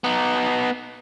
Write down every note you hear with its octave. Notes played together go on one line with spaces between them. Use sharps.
B3 D#4